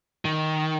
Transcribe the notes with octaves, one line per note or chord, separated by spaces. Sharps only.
D#3